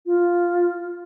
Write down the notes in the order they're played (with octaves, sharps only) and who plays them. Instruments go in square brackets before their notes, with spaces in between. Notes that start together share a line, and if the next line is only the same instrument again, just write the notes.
[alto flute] F4